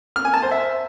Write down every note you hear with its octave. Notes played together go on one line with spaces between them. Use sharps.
F6
G#5
A5
C5
E5